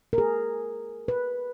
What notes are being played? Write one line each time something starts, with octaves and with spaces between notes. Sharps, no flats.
A#4
G#4
B4